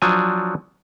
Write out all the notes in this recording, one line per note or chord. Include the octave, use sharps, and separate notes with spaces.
F3 F#3 D4 C5 G#5